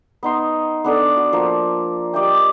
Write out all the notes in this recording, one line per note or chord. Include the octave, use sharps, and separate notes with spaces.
B3 D#4 C6
B3 D4 A4
F#4
F3 A#3 A#4
G4 D5 D#5 G5